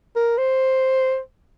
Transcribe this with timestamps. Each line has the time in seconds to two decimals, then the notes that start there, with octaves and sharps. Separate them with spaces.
0.16 A#4
0.38 C5